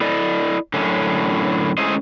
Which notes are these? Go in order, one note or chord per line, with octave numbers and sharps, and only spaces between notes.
E4 A4 D5 D#5
F#2 A2 D3 C#4
G#3 A3 C#4 E4 C5 D#5